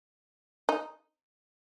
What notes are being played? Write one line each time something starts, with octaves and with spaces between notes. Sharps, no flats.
D#4